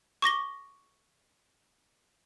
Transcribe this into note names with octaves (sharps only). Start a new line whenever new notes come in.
C#6 D6 A#6 G7